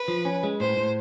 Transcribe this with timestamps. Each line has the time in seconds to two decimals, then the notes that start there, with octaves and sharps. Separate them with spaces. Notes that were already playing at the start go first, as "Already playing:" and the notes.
Already playing: B4
0.08 F3
0.25 C#4
0.43 G#3
0.60 A2 C5
0.77 A2